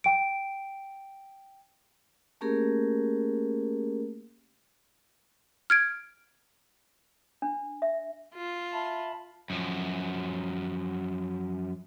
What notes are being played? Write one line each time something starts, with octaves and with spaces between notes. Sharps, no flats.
G5 D7
A3 A#3 C#4 G4 G#4 A#4
F6 G#6 D7
D4
E5
F4
E5 A5 B5
F#2 F3